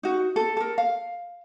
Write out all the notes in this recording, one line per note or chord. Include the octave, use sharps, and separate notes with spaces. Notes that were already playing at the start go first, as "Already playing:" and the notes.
D#4 F#4
A4
A4 A#4
F5